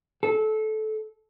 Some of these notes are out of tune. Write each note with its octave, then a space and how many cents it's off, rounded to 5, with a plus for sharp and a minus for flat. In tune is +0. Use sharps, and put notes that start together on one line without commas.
A4 -20